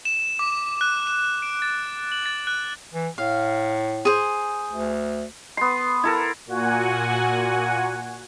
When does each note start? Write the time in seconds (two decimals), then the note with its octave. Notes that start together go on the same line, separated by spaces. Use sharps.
0.05 E7
0.39 D6
0.81 F#6
1.07 E7
1.42 D7
1.62 A6
2.12 F#7
2.26 A6
2.47 F#6
2.93 E3
3.18 A2 F5
4.05 G#4 C5
4.72 D2
5.57 B3 C6
6.03 E4 A4 A#4
6.47 A#2 F#4 F#5 G#5